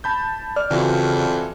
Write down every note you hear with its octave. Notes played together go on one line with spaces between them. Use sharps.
A5 B5 G6
D5 F6
F2 C#3 E3 F4 F#4